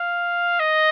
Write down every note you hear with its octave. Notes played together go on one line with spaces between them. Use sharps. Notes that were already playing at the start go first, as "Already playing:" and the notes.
Already playing: F5
D#5